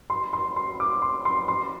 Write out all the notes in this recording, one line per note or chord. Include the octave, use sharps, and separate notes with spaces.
C6
C6
C6
D6
C6
C6
C6